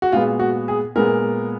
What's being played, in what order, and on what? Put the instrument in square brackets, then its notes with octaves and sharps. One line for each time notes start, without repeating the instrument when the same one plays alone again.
[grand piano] F#4
A#2 G#3 B3 F4
F#4
G#4
A#2 G#3 B3 A#4